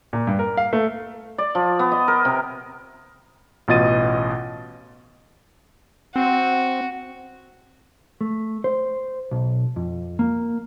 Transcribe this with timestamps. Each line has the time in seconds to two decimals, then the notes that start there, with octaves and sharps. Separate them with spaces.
0.13 A#2
0.27 G2
0.39 A#4
0.57 F5
0.73 A3
1.38 D5
1.55 F3
1.79 B3
1.92 D#5
2.08 A#4
2.25 C3
3.68 A1 B2 F4 D#5 A6 D#7
6.16 C4 F#4
8.21 A3
8.64 C5
9.31 B1
9.76 F2
10.19 A#3